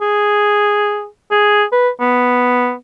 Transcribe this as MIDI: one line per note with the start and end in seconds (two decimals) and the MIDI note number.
0.01 1.06 68
1.31 1.64 68
1.72 1.89 71
2.00 2.73 59